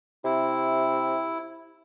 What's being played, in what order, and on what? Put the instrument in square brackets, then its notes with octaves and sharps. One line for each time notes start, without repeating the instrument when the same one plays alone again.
[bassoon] C3 [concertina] E4